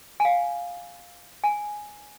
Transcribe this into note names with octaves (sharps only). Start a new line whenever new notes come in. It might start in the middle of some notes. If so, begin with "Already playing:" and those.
G#5
F5
G#5